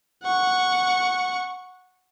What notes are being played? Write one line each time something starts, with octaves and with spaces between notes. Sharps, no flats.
F#5 C#6